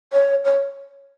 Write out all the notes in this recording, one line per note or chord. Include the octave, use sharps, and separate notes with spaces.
C#5
C#5